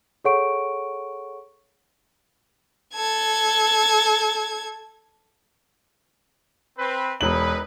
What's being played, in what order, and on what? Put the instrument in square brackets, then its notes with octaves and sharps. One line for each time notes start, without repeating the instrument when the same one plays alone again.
[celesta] G#4 A4 C#5 F#5 C#6 D7
[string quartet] A4 G#6
[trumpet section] C4 B4
[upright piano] E1 F#7 [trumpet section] D#4 B4